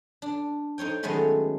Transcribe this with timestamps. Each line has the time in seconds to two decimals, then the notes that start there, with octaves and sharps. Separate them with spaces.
0.22 D4
0.78 D#4 C5 C#5 G5
1.03 D#3 F#3 G#3 A3 B3 C#4